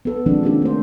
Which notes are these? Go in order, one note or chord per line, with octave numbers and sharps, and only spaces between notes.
B3 A4
D#3 F3 G#3 C4 D4
A#3 C#4 D4 G4
A3 C5